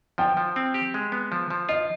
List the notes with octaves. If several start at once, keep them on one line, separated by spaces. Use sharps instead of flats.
F3 G5
F3
C4
G4
G#3
B3
F3
F3
F4 D#5